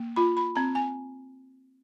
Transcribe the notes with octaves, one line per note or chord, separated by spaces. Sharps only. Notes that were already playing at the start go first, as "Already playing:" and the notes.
Already playing: A#3
F4 B5
B5
C4 A#5
G#5